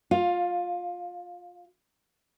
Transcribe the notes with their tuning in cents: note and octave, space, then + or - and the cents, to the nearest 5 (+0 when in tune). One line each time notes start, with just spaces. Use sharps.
F4 +20 F5 +0